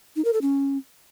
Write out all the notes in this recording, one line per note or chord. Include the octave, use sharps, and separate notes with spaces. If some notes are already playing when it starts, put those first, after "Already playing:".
D#4
A#4
A4
C#4